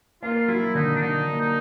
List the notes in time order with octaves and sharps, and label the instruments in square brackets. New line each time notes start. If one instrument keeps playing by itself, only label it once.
[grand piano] A#3 [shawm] F4
[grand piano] F#3 [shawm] E4
[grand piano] D3 [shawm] D#4
[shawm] D4
[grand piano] D3 [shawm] D#4
[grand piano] A#3
[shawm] D#4